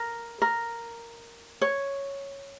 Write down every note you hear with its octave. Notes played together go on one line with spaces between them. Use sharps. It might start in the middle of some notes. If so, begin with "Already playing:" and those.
Already playing: A#4
A#4
C#5